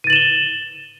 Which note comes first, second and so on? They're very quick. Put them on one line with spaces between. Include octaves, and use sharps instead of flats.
D#7 A6 F#7 E7 G7